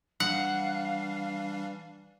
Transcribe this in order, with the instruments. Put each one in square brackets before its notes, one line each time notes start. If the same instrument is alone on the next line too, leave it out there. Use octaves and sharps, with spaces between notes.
[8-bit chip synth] E3 G3 D4 [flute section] F5 [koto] F#5